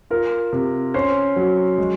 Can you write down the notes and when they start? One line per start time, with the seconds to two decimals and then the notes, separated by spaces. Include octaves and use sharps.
0.10 F4 A#4
0.53 C3
0.94 C#4 C5
1.36 F#3
1.78 G#3